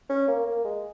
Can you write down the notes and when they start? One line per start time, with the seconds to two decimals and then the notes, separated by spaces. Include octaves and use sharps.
0.10 C#4
0.28 A#3
0.46 A#3
0.65 G#3